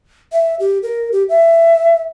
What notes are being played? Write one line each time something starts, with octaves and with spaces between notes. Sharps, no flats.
E5
G4
A#4
G4
E5